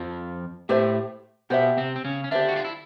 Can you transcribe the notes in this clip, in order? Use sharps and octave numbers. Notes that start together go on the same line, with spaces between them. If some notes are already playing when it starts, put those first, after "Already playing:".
Already playing: F2 F3
A2 A3 G4 C5 E5
B2 B3 G4 C5 E5
C3 C4
C4
C#3 C#4
C#4
D3 D4 G4 C5 E5
F#4
F4
E4